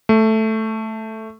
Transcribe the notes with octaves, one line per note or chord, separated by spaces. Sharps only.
A3